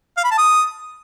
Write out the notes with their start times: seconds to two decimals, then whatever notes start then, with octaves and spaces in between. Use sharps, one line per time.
0.17 F5
0.24 B5
0.31 A5
0.38 D#6